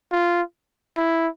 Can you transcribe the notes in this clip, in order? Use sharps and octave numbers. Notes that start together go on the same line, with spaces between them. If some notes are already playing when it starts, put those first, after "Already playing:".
F4
E4